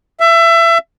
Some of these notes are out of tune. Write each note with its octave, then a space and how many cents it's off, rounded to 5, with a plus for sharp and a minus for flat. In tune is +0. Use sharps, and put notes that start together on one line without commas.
E5 +25